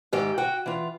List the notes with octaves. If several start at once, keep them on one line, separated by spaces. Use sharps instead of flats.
G#2 D#3 G4 D#5 E5
F#4 G5
E3 F4